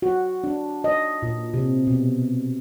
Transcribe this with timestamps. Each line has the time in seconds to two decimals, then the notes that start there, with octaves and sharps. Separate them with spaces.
0.02 F#4
0.44 D4
0.84 D#5
1.23 A#2
1.54 C3
1.87 B2